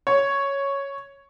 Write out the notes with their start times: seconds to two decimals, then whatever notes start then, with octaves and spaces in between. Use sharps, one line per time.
0.07 C#5